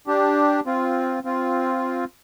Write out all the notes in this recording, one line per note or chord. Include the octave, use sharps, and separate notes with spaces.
D4 G4
C4 F4
C4 F4